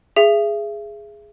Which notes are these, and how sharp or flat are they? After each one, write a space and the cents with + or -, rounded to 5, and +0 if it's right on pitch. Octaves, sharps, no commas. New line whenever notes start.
G#4 +0 E5 +35